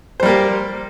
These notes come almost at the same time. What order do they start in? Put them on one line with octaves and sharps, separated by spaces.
C5 G3 A#3 G4